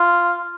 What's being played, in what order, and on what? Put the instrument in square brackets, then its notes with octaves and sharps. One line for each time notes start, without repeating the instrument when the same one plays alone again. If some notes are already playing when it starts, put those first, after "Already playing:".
Already playing: [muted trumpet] F4